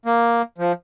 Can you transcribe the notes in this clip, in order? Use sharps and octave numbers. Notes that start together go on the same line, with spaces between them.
A#3
F3